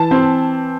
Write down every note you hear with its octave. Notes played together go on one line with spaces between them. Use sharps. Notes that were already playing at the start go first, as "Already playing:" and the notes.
Already playing: E3 A5
C4